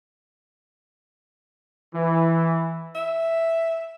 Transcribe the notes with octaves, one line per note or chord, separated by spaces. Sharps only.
E3
E5